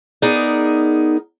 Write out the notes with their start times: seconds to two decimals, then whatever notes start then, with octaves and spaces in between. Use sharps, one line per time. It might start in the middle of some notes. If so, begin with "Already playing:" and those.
0.22 B3 D#4 G#4 A#4 D5